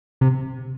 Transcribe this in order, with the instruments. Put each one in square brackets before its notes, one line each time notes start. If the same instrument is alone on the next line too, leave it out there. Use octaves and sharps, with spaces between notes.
[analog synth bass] C3